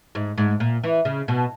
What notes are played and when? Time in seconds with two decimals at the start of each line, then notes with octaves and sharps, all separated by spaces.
0.15 G#2
0.37 G#2
0.60 A#2
0.83 E3
1.05 C#3
1.28 B2